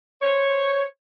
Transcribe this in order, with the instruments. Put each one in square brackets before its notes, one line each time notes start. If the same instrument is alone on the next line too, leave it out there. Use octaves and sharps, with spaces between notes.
[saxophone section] C5 C#5